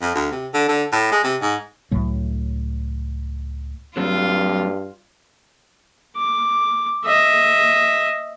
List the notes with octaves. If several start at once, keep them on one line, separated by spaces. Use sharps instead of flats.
F2
D2
C3
D3
D3
A2
G#3
C3
G#2
C#2 A2 F#3 A3
G2 F#3 A3 C4 F4
D6
D#5 E5